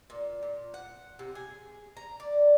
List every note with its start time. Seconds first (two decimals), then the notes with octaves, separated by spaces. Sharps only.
0.10 A#2
0.43 A#2
0.74 F#5
1.19 C3
1.35 G#4
1.97 A#5
2.20 D5